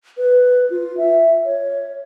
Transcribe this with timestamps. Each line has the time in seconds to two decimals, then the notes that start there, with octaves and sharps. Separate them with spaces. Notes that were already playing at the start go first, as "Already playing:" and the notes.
0.17 B4
0.70 F4
0.97 E5
1.45 C#5